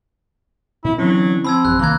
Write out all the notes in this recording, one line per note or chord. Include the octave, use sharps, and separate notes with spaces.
A#2 E4
D3 E3 F#3 C4 C#4 E4
F3 C4 B5 E6 G#6
A1 F#2 F#6
C2 D#3 A#3 A#5 F#6 G#6